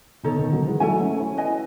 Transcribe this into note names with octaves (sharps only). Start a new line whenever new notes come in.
B2 D#3 D#4 A4 C#5
B2 D#3
D#3 F#3
E3 G#3
F#3 A3 A4 E5 G#5
A3 C#4
C#4 E4
B4 D#5 G#5